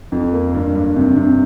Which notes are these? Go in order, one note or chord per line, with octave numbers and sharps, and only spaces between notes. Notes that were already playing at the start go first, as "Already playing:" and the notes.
F2
A#3
G2
G2
C3
C3